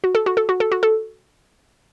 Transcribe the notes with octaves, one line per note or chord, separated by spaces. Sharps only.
F#4
A4
F#4
A4
F#4
A4
F#4
A4